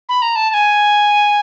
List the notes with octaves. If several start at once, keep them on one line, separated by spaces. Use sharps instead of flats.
B5
A#5
A5
A5
G#5